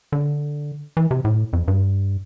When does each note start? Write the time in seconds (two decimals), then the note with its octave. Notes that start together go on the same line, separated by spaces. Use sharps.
0.12 D3
0.97 E3
1.11 C3
1.25 A2
1.53 F2
1.68 G2